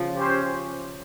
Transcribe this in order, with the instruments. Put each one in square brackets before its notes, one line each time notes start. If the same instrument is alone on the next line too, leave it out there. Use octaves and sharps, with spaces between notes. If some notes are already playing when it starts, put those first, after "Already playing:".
Already playing: [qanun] C#3 F3
[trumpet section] C#4 G4 C5